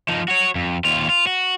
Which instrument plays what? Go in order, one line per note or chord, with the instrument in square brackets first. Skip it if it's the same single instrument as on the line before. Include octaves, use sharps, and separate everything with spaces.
[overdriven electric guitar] F3 D#4
F#4 C#5
F2
D#2 F4
F4
F#4